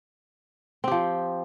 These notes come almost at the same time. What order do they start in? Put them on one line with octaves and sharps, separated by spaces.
C4 G4 F3